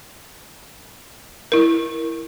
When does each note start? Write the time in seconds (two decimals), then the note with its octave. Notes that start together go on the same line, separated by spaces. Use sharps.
1.52 E4 A#4